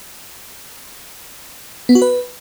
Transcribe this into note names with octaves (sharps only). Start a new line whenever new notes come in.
B3
F#4
B4